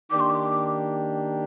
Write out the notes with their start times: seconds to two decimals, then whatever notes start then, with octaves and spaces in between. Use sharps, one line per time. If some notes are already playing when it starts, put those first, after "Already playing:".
0.11 D#3 A#3 D4 G4 D6
0.20 C6
0.30 D6